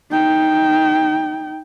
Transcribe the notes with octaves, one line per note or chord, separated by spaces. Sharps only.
D#4 G5